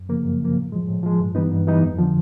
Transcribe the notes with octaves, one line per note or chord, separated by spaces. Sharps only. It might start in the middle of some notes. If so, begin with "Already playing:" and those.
Already playing: F#2
C#3 F3 A#3
F#2
C#3 F3 A#3
A2
F3 G#3
A2
F3 G#3
G2
E3 G3 B3 D#4
G2
E3 G3 B3 D#4
F2
D3 F3